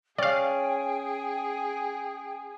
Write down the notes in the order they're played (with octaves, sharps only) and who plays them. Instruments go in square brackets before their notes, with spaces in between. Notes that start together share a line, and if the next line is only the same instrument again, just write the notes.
[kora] C#4 [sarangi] G#4 [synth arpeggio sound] D5 F5 [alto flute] G5